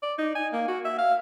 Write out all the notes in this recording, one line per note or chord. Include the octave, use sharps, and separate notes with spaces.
D5
D#4
G#5
A#3
F#4
E5
F5